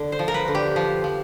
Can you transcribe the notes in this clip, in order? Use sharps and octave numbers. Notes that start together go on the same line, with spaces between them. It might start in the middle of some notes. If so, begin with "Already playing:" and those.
Already playing: D3
C5
F3
A#4
B4
D3
G4
F3
F3